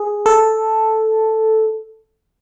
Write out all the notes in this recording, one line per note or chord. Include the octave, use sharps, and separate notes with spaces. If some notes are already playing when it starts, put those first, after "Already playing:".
Already playing: G#4
A4